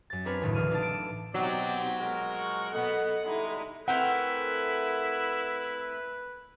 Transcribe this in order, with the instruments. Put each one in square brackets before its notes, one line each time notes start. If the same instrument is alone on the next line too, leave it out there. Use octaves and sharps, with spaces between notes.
[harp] F#2 A6
C4 D4 A#4 B4 C#5
D#2 A2 C#3
A1 D3 F6 D#7
D4 D#4 A4 D5 A5
D7
[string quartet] B2 C4 G4 [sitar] F#3 [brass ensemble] D#4 D5
[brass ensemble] A#1 G#3 A#4
[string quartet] C#6 F#6
[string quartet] B2 B3 [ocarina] A4 [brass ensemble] D#5 F#5
[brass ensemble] D3 G3 G#3 [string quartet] D#4 E4
[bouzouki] A3 C4 A#4 [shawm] E4 [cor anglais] B4 [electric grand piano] F#5